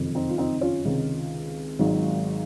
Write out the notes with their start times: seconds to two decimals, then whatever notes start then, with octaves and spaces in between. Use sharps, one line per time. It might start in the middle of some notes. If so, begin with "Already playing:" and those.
Already playing: F#1 F2 C3 D#3
0.15 C4 D#4
0.29 F4
0.38 C4 D#4
0.61 C#4 F4
0.85 C#2 C3 D#3
1.79 G#1 G#2 D#3 F#3